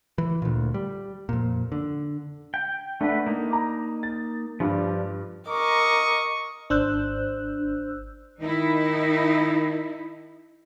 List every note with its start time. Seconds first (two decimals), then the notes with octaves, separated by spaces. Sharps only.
0.18 E3
0.42 D2 A#2
0.74 G3
1.29 F2 A#2
1.72 D3
2.54 G5
3.01 A3 D4 B4 F#5
3.27 A#3 D#4
3.51 A#5 D6
4.03 A6
4.60 G2 F3 G3 D4
5.48 A#4 D#5 C#6 D6
6.70 G#1 D4 C5 E6 F#6 G6
8.40 D#3 D#4 E4